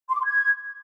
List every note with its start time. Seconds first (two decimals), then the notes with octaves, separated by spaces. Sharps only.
0.09 C6
0.15 D6
0.20 C6
0.25 G#6